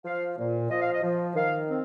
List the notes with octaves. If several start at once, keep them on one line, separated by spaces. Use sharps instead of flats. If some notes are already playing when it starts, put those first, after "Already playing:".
F3 F5
A#2
F3 D#5
F5
D#5
F3
D#3 F5
C4